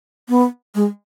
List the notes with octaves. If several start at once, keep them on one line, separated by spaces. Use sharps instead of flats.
B3
G#3